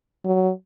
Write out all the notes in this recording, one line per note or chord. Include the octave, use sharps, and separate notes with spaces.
F#3